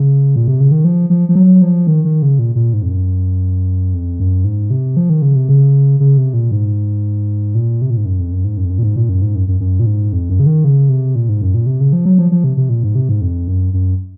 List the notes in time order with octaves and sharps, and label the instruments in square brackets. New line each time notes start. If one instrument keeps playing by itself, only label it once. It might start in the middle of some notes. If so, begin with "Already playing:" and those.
Already playing: [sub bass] C#3
A#2
C3
C#3
D#3
F3
F3
F3
F#3
F3
D#3
D#3
C#3
A#2
A#2
G#2
F2
F#2
F2
F#2
G#2
C3
F3
D#3
C#3
C3
C#3
C#3
C3
A#2
G#2
A#2
C3
A#2
G#2
F#2
F2
F#2
G#2
F#2
F2
F#2
A#2
G#2
A#2
F#2
G#2
F#2
F#2
F#2
A#2
G#2
F2
F#2
C#3
D#3
C#3
C3
A#2
G#2
F#2
A#2
C3
C#3
F3
F#3
F3
F3
C3
C3
A#2
G#2
C3
G#2
F2
F#2
F#2